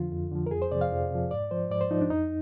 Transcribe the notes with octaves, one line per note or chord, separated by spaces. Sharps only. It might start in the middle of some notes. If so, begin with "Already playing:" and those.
Already playing: F2 D3 F3 F4
F2
D3 F3
A#4
F2 G#4
C5
C3 F3 D5
F5
F2
C3 F3
G#2 D5
F3 C5
G#2 D5
C5
F3 D#4
D4
F2 D#4